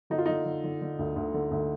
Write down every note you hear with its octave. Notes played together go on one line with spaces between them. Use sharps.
D3 D#4
F4
D3 D#4
D3
D3
D3
D2
D2
D3
D2